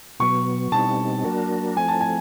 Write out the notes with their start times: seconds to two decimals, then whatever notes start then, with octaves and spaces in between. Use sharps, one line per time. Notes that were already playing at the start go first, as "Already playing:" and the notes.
0.20 B2 F#3 B3 C#6
0.72 B2 G3 C4 D#4 A5
1.24 F#3 A#3 D4 F#4 A#4
1.77 F3 A3 C4 G#5
1.88 A5
2.01 G#5